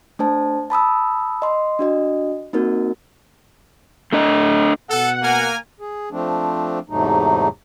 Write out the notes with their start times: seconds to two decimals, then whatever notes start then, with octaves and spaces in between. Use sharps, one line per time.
0.19 A3 D4 C5 A5
0.70 A5 B5 D#6 E6
1.42 D#5 C6
1.79 D4 F#4 D#5
2.53 A#3 C4 D#4 F#4 A#4
4.13 A3 D4 D#5
4.90 B2 A4 F#5
5.22 A#3 A#4 G#5
5.80 G#4
6.11 F3 A3 C4 D4
6.90 E2 G#2 C3 F#3 A3 D#4